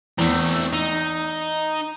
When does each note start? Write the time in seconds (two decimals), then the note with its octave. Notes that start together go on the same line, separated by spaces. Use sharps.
0.18 E2 A3 C4
0.73 D#4